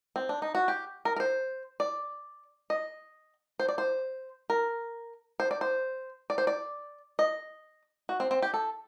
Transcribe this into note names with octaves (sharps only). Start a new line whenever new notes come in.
C4
D4
D#4
F#4
G4
A#4
A#4
C5
D5
D#5
C5
D5
C5
A#4
C5
D5
C5
D5
C5
D5
D#5
F#4
C4
C4
G4
A4